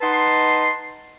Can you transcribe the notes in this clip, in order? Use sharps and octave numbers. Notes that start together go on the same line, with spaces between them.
D#4 B4 D#5 F#5 A5 C6